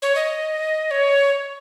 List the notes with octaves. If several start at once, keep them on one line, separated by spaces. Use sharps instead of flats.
C#5
D#5
C#5